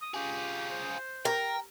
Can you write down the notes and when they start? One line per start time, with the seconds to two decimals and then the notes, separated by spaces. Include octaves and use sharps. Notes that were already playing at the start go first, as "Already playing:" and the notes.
0.02 D#6
0.14 F4 G4 G#4
0.71 C5
1.25 A#4 G5